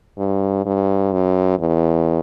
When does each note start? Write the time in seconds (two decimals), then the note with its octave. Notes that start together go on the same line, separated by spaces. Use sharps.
0.18 G2
0.66 G2
1.13 F#2
1.59 E2